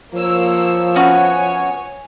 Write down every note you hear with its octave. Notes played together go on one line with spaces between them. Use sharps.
F3 A#3 C#5 E6
B3 C#4 F#4 C#5 G#5